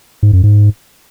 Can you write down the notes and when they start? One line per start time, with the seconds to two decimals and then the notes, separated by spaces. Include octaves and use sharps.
0.23 G#2
0.33 F#2
0.44 G#2